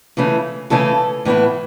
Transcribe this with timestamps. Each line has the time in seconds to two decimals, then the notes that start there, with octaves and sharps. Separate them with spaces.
0.17 C#3 E3 A3 C#4
0.70 C#3 E3 A3 C#4 A4
1.25 A2 E3 B3 E4